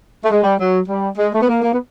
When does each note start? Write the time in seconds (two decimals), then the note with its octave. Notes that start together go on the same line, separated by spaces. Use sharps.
0.24 A3
0.30 G#3
0.44 G3
0.59 F#3
0.89 G3
1.18 G#3
1.33 A3
1.42 B3
1.47 A#3
1.62 A#3
1.73 B3